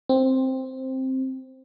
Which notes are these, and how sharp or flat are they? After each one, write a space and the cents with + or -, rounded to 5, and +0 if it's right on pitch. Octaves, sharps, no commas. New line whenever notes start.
C4 +5